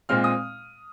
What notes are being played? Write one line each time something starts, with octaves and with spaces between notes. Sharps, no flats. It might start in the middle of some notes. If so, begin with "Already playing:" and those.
A#2 G#3 C4 F6
D#6